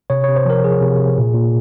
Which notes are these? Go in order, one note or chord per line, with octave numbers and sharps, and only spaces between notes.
C3 C#5
C3 C#5
C5
F3 A#4
F3 G#4
C3
C3
A#2
A#2